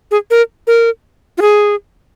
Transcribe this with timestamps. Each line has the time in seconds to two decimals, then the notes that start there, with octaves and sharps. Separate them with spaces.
0.11 G#4
0.31 A#4
0.67 A#4
1.38 F4
1.42 G#4